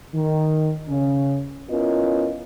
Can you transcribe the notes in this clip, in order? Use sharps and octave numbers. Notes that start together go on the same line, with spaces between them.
D#3
C#3 C#4
B3 C#4 E4 F4 A#4 D#5